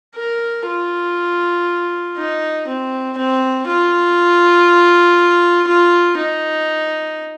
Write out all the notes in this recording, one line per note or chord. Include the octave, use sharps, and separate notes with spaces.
A#4
F4
D#4
C4
C4
F4
F4
D#4